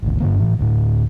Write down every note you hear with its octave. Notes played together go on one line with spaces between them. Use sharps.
G#1 D2
G2 D3 A#3
A2 E3
D2 A2